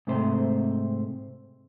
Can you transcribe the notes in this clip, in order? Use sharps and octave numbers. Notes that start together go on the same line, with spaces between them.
G#2 C3 A3 C5